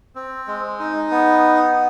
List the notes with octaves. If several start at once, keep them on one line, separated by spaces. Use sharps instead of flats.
C4
G#3
D#4
B3